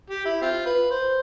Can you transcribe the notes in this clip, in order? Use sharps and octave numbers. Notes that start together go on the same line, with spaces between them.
G4
E4
C4 F4
B4
C5